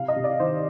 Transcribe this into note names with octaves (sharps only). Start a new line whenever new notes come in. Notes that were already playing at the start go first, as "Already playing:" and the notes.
Already playing: C3 F5
D#5
C3
D5
D#3 C5